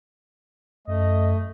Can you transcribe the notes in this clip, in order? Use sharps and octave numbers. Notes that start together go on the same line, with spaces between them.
F#2 A3 D#5